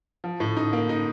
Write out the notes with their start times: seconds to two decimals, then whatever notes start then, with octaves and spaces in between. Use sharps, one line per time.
0.24 F3
0.40 A2
0.57 D#4
0.73 A#3
0.89 D#4